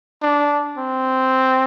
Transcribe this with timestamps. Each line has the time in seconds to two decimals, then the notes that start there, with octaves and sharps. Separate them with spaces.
0.22 D4
0.78 C4